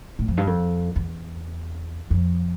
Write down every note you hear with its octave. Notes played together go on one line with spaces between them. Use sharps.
A2
F2
G2
F2
E2
F2